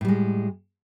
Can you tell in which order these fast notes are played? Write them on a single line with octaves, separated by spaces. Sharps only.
A2 G3 G#3